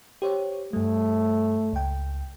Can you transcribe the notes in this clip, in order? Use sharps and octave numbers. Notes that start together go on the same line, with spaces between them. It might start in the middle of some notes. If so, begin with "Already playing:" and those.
G4 C5 C#5
G2 G3 A3
C#2 G5